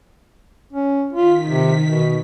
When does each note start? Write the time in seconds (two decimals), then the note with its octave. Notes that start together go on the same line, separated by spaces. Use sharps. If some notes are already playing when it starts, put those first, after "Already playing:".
0.73 C#4
1.13 D#3 F4 B6
1.47 C3
1.86 B2